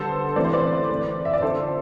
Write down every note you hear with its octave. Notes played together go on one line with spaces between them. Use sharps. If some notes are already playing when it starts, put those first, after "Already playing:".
Already playing: D3 G3 B3 A4 C5
E3 A3 C4 D5
C5
B4 D5
E3 A3 C4
E5
D5
D3 F3 C4 A4 C5